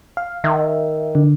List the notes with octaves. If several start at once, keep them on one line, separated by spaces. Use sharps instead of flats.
F5
D#3 E5
D3